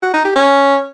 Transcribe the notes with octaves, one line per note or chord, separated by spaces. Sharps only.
F#4
D#4
G4
C#4